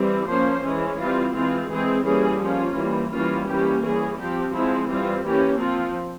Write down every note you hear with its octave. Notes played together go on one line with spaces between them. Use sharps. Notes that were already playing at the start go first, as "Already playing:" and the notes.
Already playing: E3 G3 C4
F3 A#3 C#4 C5
E3 G#3 C#4
E3 G3 C4 F4
E3 G#3 C4 F4
E3 G#3 C4 G#4
E3 G3 A#3 C#4 G#4
F3 A#3 C#4 F4
E3 G3 A#3
E3 G3 A#3 C#4 F4
E3 G3 A#3 C#4 G4
E3 G3 C#4 G#4
F3 C4 G4
F3 G#3 C4 E4
E3 G3 C4 F4
E3 A#3 C#4 G4
F3 C4 F4